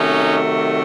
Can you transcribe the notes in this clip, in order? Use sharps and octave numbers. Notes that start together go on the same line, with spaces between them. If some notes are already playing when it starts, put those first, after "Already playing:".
Already playing: C3 D#3 F#3 A3 C#4 D#4